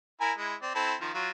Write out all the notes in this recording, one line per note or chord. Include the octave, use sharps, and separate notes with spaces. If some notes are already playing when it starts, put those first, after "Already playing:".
E4 A#4 G#5
G#3 E4
C4 D5
C4 E4 A4
D#3 F3
F#3 F4